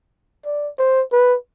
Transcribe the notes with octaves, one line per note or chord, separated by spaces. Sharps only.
D5
C5
B4